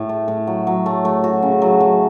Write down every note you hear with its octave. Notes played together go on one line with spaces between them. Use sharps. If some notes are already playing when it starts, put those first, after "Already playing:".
Already playing: A2
A3
A2
F#3
F#3
A3
A3
F#4
C#3
F#3
F#3